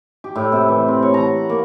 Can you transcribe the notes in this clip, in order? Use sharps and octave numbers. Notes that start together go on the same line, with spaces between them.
G4
A2
C3
E3
C4
C#5
A#5
F#5
A#3